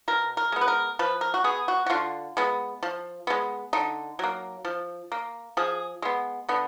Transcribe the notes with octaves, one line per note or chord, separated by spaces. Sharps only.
B2 A#4
A#4
G#3 B3
B4
A#4
F3 B4
A#4
F#4
B3 G#4
F#4
F#4
D3 F4
G#3 B3
F3
G#3 B3
D3 D#4
F#3 A#3
F3
A#3
F3 G#4
G#3 B3
D3 B3